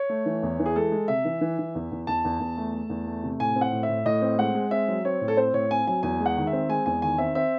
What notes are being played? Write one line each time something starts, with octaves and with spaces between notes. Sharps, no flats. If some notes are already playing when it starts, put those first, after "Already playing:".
Already playing: C#5
A3
E3
E2
E3
G#4
G#3 A4
G#3
C3 E5
E3
E3
E3
E2
E2
E2 A5
E2
E2
A3
A3
E2
A3
C3
A2 G#5
C4
F#5
A2
E5
A2
A2 D#5
C4
G#3 F#5
G#3
C4 E5
F#3
C4 C#5
A2
A4
C4 C5
A2 C#5
C4 G#5
F#3 G#5
E2 G#5
G#3
F#5
D#3
E5
C4
G#3 G#5
E2 G#5
D#3 G#5
C4 E5
C4 E5